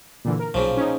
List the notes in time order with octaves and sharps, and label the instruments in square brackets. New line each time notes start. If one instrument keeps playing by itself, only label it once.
[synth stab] A#2 D3 E3
A#4
[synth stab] B1 [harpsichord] A#2 C#3 F3
[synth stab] C#4 D#4